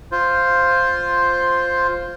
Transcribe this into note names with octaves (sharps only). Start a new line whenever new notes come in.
F4 C5